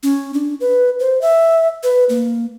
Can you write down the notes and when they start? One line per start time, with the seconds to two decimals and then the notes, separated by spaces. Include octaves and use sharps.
0.03 C#4
0.34 D4
0.60 B4
1.00 C5
1.21 E5
1.83 B4
2.09 A#3